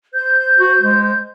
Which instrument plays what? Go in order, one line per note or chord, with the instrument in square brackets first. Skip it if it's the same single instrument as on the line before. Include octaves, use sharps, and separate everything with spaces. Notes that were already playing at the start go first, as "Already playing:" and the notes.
[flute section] C5 G6
[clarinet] F#4
G#3